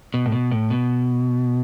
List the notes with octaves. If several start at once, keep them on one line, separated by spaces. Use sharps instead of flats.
B2
A2
B2
A2
B2